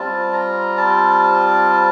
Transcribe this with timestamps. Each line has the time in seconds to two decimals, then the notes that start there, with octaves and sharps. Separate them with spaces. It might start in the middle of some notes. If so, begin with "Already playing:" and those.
Already playing: G3 C4 F4 A5
0.33 A#5
0.77 A5